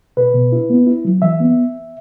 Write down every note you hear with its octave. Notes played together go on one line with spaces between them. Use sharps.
B2 B4
B2
E4
B3
E4
F#3
E3 E5
B3